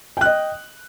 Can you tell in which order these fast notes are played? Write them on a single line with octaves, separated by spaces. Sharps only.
G5 F#6 D#5